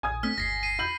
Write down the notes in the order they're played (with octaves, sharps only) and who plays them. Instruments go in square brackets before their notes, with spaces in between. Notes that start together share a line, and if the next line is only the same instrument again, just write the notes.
[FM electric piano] A#1 [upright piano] G#5 D#6 G#6
[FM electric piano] A3 C4 D4 [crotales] F6 B6
[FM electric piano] G1 D#2 [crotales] A#6 C7
[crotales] C7 D#7
[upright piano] B5 G6 F#7